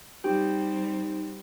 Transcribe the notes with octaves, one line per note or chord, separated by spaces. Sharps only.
G3 C4 D#4 G4